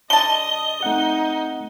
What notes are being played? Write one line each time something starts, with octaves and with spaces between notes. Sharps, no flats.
D3 D#5 A5 G7
A3 C4 D#4 F#5